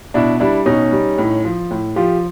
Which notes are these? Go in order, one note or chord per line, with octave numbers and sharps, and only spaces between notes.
B2 D4 E4
G3 D4 E4
B2 C#4 D#4
G3
A2
F3
A2
F3 F4 G4